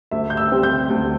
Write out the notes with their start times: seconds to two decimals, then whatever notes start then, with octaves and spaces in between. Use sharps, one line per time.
0.11 D2 E5
0.30 G6
0.37 E6
0.51 C3 G3 C4
0.63 G6
0.90 D2